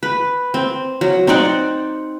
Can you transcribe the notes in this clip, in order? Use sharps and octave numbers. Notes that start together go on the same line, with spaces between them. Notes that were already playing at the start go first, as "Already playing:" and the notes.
B4
C4
F#3
C4 D#4 D5 F#5